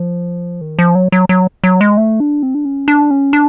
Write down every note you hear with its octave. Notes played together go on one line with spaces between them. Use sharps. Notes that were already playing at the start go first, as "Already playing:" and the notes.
Already playing: F3
D#3
F3
F#3
F#3
F#3
F#3
G#3
A3
D4
C4
D4
C#4
D4
C#4
D4